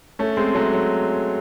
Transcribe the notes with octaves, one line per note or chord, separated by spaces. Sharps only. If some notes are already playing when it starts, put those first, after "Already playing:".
A3 C#4
G#3 C4
F#3 A3
F#3